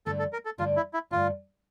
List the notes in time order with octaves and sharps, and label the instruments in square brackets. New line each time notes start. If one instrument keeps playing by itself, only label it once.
[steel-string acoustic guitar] G2 D3 A3 D4 [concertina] A4
[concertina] A4
A#4
A4
[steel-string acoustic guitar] G2 D3 A3 D4 [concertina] F4
[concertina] E4
E4
[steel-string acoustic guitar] G2 D3 A3 D4 [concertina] F4